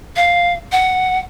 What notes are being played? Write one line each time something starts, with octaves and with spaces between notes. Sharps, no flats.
F5
F#5